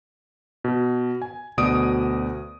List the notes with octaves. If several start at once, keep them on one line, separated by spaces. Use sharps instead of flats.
B2
G#5
D2 B2 D5 D#6 D7